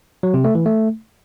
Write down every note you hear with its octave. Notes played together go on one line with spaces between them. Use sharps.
F#3
C3
A3
E3
A3